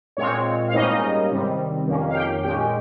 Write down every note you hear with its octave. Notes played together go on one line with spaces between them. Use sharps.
A#2 G#3 C4 C#5
F5
G#2 G3 A#3 C#4 D#4 D#5
C3 D#3 G3 C4
F2 D#3 A#3 C#4
F5
G4 G5
A#2 G#3 C#4 G4 G5